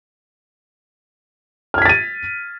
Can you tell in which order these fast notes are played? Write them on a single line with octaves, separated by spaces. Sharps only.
F6 G#6 B6 A6 D#7